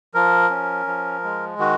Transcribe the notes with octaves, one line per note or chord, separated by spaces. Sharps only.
F3 A#4
C#4
F3
G#3
D#3 F#4